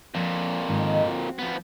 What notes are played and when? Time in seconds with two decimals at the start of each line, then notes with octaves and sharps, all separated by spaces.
0.15 F2 A#2 F3
0.69 G#2 D#3 D#5
1.05 C4 F#4
1.39 F3 B3